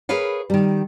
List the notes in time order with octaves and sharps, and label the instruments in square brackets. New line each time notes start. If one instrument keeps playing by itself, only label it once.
[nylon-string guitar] G#4 A#4 B4 C#5 F5
D#3 G3